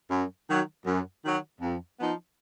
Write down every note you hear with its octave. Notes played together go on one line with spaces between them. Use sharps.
F#2
D#3 F#3
F#2
D#3 F#3
F2
F3 B3 D#4